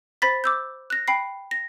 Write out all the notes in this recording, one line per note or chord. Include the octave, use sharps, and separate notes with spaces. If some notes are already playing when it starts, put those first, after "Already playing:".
C5 B5 A6 B6
D6 E6 G6
F#6 A#6
G5 B5 C7
A#6